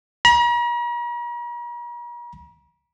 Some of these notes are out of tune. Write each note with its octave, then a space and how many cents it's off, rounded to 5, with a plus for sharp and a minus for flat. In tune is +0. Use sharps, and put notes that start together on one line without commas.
A#5 +45